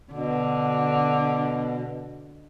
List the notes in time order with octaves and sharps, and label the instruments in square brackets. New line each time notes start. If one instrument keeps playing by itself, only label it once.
[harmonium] B2 [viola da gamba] D3